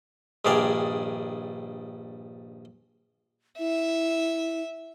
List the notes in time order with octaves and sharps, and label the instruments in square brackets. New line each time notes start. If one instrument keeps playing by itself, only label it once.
[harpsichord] A#1 G2 D#3 G#4 D5
[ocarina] E4 [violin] E5